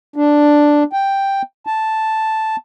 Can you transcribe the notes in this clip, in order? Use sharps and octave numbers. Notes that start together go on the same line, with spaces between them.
D4
G5
A5